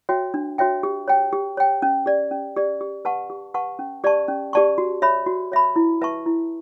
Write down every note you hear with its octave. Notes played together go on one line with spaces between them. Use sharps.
F#4 C#5 E5 G5
D4
F#4 C#5 E5 G5
G4
C#5 G5
G4
C#5 G5
C#4
G4 D5
C#4
G4 D5
G4
B4 F#5 A5 C#6
G4
B4 F#5 A5 C#6
C#4
G4 D5 A5 C#6
C#4
G4 D5 A5 C#6
F#4
C#5 E5 B5
F#4
C#5 E5 B5
E4
B4 E5 A5 C#6
E4